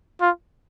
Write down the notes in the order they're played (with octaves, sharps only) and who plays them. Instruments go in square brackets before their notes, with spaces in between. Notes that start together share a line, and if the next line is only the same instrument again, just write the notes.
[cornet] F4